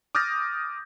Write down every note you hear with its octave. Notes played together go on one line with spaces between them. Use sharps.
D6 D#6 F6 G6 A6 A#6